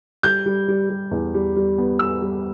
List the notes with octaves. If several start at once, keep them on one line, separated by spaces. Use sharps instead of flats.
G3 G6
G3
G3
G3
E2
G3
G3
B3
B3 E6
G3